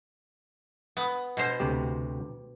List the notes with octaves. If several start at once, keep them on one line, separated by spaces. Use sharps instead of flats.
B3
B2 C5
D2 C3 G4